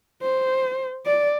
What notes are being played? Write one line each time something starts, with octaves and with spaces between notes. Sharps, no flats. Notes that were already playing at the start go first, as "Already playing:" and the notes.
C5
D5